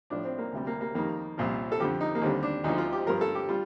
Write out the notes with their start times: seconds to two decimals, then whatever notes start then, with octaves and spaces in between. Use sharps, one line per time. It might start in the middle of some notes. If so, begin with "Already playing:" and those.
0.10 A2 F3 D4
0.25 C4
0.38 A#3
0.53 D2 C3 G3
0.67 A#3
0.81 A#3
0.95 F2 D#3 G3 A#3
1.38 C2 A#2 F3
1.72 A4
1.80 F2 D3 F3 G4
2.01 D#4
2.15 A#3
2.22 D#2 D3 G3 C4
2.43 D4
2.64 D2 D3 F3 D#4
2.78 F4
2.93 G4
3.06 G2 F3 A#4
3.21 A4
3.35 G4
3.49 G3 F4